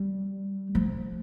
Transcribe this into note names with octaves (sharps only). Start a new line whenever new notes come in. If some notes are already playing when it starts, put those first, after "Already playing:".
Already playing: G3
F3